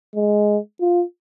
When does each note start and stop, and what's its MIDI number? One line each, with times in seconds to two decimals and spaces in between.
0.16 0.58 56
0.81 1.03 65